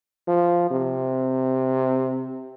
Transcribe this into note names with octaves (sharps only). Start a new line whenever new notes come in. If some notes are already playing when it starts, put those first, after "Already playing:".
F3
C3